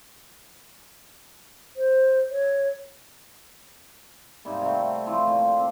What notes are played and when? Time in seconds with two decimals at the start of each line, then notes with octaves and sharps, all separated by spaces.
1.76 C5
2.30 C#5
4.45 G#2 C3 G3 A#3
4.62 C3 F#3 G3 A3
5.06 E3 F3 A3 C4
5.27 A#2
5.56 C4 D4